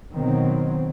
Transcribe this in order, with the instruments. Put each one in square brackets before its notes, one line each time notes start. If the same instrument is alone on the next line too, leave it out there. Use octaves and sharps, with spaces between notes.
[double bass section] B2 D#3 F#3 C4